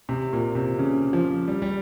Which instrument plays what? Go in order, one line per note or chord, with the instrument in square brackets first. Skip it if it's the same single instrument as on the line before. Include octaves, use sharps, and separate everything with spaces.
[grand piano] C3
A#2
C3
C#3
F3
G3
G3